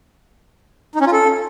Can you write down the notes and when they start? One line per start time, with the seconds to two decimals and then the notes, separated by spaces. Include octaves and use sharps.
0.95 D#4
1.01 C#4
1.07 F4
1.13 A4